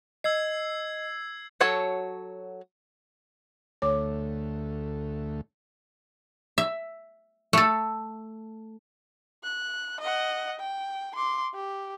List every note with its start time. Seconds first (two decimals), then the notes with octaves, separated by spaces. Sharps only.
0.24 D#5 E6 G#6 C7
1.61 F#3 F#4 A4 C#5 A5
3.82 D2 A3 C#5 D6
6.58 E5
7.53 A3 A4
9.43 F#6
10.00 D#5 F#5
10.60 G5
11.16 C6 D6
11.54 G4